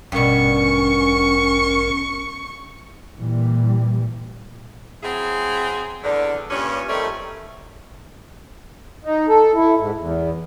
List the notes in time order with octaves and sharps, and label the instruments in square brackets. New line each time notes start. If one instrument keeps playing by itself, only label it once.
[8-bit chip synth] A1 A#4 [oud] G2 B2 [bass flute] C#4 [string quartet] C#6
[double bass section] A#2 E3 G3
[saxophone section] F#3 C4 E4 G#4
E2 D3
G2 A#2 C#4
D#3 F3 G3 A3 C4 C#5
[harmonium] D#4
A4
E4
G#2
E2